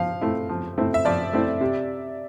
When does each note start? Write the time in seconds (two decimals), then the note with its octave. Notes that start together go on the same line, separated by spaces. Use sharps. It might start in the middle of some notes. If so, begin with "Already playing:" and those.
Already playing: F3 F5
0.21 A3 C4 E4
0.49 F3
0.78 A3 C4 E4
0.94 E5
1.05 F3 D5
1.33 A3 C4 E4
1.61 C3